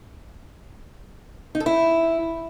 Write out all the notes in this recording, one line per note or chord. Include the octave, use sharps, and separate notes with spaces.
D#4
A4
E4